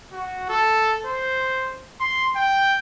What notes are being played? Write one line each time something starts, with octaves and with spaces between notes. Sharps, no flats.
F#4
A4
C5
C6
G5